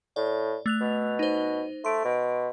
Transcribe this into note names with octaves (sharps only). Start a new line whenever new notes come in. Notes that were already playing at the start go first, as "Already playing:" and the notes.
A2 D5
A3 F#6 F7
B2
D#4 C5
A3 C6 D7
B2